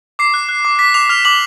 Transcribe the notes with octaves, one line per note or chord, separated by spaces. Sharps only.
D6 C7
F#6
F#6
D6
D6 B6
D6 F7
F6 F7
D6 F#7